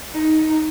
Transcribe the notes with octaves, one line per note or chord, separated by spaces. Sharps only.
D#4